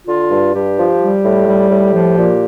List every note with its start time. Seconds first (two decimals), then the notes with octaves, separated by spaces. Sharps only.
0.07 D3 F4
0.31 G2
0.54 G2 G4
0.77 F3
1.00 G3
1.24 A2
1.47 G3
1.70 A2
1.93 F3
2.17 A#2